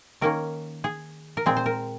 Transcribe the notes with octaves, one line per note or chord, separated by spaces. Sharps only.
D#3 A#3 C#4 A#4
G#4
A#4
A#2 G#3 C4 G#4
C5
A#4